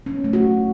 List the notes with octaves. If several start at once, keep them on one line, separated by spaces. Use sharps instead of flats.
C#4
B3
A3
F#4